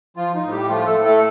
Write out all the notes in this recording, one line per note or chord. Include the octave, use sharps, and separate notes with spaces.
F3 F4
D#4
A2
G3 G4
F3 A3 F4
A3 A4
A2
A3 A4